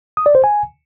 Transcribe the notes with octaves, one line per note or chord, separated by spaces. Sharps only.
D#6
D5
C5
G#5